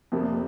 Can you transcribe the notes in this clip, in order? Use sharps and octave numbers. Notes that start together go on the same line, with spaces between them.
F1 F2 C3 F3 A#3